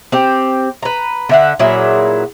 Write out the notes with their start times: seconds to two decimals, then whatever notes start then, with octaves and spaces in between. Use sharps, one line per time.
0.12 C4 G4
0.83 B4 A#5
1.29 D3 E5 F#5
1.59 A#2 F#3 E4 G#4